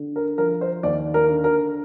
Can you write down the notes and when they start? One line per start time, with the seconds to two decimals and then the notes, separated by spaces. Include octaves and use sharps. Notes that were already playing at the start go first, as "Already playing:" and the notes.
Already playing: D3
0.16 A#4
0.38 F3 A#4
0.61 C5
0.83 D#2 D5
1.14 A#4
1.29 D3
1.44 A#4